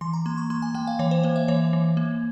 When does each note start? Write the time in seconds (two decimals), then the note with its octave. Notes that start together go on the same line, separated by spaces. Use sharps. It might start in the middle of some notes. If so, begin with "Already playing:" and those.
0.01 E3 C6
0.13 A#5
0.26 A#3 C6
0.37 C#6
0.50 A#3 C6
0.62 G#5
0.74 A#3 G5
0.87 F5
0.99 E3 C#5
1.11 C5
1.23 A#3 C5
1.36 E5
1.48 E3 C#5
1.73 E3
1.97 A#3